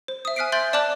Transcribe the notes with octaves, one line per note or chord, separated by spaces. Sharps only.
C5
E5 D#6
G#5 F6 F#6 B6 C7 D7
E5 C6 G6 A6 F#7
D5 A5 D6 F#6 F#7